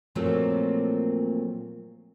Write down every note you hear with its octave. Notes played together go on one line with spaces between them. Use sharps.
A#2 F3 F#3 A3 A#3 C4